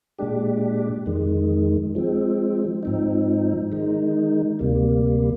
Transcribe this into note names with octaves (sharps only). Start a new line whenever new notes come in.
A#2 G#3 D4 G4
F2 D#3 G#3
F3 G#3 C4
G#2 F3 C4 D#4
D#3 G#3 D#4
D2 C3 G3 A#3